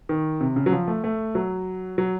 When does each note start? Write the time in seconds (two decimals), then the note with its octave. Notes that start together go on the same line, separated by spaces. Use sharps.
0.09 D#3
0.40 C3
0.56 C#3
0.66 F#3
0.72 F3
0.88 A3
1.04 A3
1.35 F#3
1.98 F#3